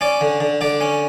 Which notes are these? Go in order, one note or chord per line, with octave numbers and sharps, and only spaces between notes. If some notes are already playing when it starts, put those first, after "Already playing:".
C#4 D5
D3
D3
D3 D5
C#4